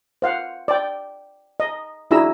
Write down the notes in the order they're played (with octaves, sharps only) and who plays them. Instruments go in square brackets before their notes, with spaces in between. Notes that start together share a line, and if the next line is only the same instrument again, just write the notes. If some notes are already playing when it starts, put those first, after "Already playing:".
[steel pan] C5 F5 F#5
D5 G5
D#5
D4 E4 F#4 G#4 A#5 E6